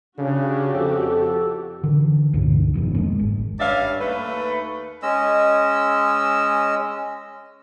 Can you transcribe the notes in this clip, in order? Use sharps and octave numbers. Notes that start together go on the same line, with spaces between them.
C#3 D4 F#4 G4
F2 A4
D3 E3
C#2 G2 A#2 D3
F1 F2 B2 D#3
G#3 A#3 C#4
G#1
G2 C#4 D5 E5 F5
D#2 A3 B4
G#3 C#4 D#5 E6